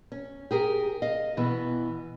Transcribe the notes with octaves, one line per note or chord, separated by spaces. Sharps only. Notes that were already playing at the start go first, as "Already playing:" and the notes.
C#4
G4 G#4 A#4
D#5 F5
B2 E3 B3